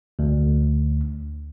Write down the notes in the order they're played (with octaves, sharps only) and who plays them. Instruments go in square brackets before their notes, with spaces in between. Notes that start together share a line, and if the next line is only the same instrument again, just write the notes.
[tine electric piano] D2